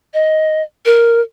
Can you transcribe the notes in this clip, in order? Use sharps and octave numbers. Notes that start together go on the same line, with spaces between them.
D#5
A#4